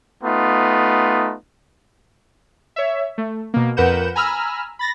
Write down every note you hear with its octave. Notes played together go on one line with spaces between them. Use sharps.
A3 B3 D#4 F4
C#5 E5
A3
B2 A#3
F2 A#4 B4 F#5 G6 E7
G#5 A#5 B5 E6 F6
B5 A6 A#6